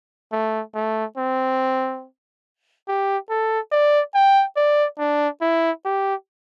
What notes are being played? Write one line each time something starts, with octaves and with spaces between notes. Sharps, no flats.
A3
A3
C4
G4
A4
D5
G5
D5
D4
E4
G4